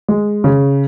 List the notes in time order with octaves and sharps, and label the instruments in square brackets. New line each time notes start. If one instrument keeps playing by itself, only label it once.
[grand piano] G#3
C#3